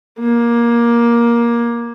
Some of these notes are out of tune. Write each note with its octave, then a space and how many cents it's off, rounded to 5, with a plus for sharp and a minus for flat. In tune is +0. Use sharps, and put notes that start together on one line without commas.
A#3 +15